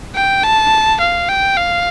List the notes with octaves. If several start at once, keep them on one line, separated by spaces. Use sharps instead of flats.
G5
A5
F5
G5
F5